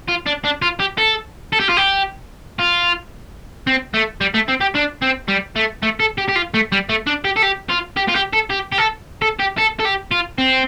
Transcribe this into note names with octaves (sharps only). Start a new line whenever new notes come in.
F4
D4
D4
F4
G4
A4
A4
G4
F4
G4
F4
C4
A3
G3
A3
C4
G4
D4
C4
G3
A3
A3
A4
G4
G4
F4
A3
G3
A3
D4
G4
A4
G4
F4
G4
F4
G4
A4
G4
G4
A4
A4
G4
A4
A4
G4
F4
C4